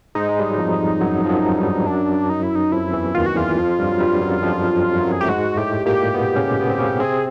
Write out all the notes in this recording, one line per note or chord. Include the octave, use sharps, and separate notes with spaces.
G#2 G#3 D#4
G#3
G3
F#3
F2 F3
F#2 F#3
F3
F#2 F#3
G2 G3
F#2 F#3 D4
D#4
E4
D#4
F2 F3 E4
E2 E3
D#2 D#3 F4
F#4
E2 E3 F4
F2 F3
G2 G3
F#3
G2 G3
F#2 F#3
F2 F3
F#2 F#3
G#4
A3 G4
G#2 G#3 F#4
A2 A3 G4
A#2 A#3 G4
B2 B3
C#3 C#4
B3
C4
C#3 C#4
C3 C4 G#4